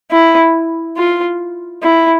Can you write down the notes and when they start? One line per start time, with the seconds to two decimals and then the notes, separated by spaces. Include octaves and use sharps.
0.11 E4
0.97 F4
1.82 E4